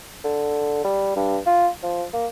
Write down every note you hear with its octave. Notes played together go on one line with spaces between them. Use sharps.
D3
G3
G2
F4
F3
A#3